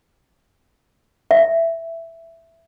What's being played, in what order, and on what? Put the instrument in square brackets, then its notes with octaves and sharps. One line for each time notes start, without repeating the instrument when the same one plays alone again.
[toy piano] E5